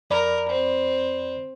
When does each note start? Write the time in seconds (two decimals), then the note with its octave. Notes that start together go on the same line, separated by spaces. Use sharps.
0.10 F2 A#4 D5 B5
0.49 C4